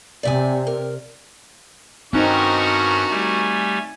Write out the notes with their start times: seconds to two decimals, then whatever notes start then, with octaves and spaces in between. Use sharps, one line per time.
0.23 C3 D5 E5 G#5
0.67 A#4
2.13 G2 C4 C#4 D#4 F#4 A#4 C#6 F#6
3.11 G3 A3 G4 G#5